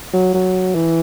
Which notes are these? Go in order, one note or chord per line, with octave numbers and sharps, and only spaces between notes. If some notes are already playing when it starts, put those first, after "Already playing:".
F#3
F#3
E3